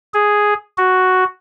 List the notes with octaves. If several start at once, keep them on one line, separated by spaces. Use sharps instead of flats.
G#4
F#4